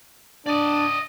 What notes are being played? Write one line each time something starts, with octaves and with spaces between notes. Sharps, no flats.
D4 D5 D#5